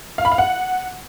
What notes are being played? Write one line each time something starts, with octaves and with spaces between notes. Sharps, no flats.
F5
B5
F5
F#5